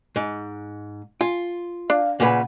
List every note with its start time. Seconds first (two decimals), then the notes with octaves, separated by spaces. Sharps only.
0.16 G#2
1.21 F4 G#5
1.90 D4 F5
2.20 A#2 C#3 B4 F#5